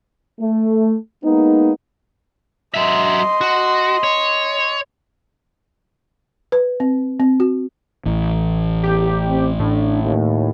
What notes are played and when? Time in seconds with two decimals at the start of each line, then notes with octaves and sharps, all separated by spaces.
0.40 A3
1.24 G#3 A#3 B3 D#4
2.74 F#3 D#5 E5 C6
3.41 F#4
4.04 C#5
6.52 B4
6.80 C4
7.20 C4
7.40 F#4
8.05 A1 E3
8.83 E2 G4
9.28 C4
9.59 A2 D4
10.04 D#2